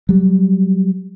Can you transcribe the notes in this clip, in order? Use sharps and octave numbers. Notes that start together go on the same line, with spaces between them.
F#3 G3